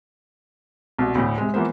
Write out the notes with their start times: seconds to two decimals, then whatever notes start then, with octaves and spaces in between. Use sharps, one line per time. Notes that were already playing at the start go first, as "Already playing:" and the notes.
0.99 C2 B2
1.15 D2 A2
1.38 C3 G#3
1.54 E3 F3 A#3 B3 C5